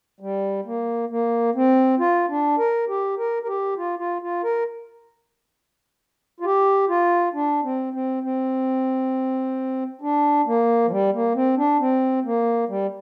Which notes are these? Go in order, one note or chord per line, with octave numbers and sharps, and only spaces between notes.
G3
A#3
A#3
C4
F4
D4
A#4
G4
A#4
A#4
G4
F4
F4
F4
A#4
F4
G4
F4
D4
C4
C4
C4
D4
A#3
F3
G3
A#3
C4
D4
C4
A#3
G3